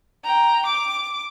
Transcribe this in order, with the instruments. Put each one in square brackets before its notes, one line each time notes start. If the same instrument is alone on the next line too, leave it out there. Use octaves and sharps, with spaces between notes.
[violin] G5 A#5
D6